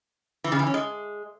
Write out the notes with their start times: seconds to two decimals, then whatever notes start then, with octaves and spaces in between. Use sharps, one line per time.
0.44 E3
0.52 C#3
0.59 E3
0.67 C#4
0.74 G#3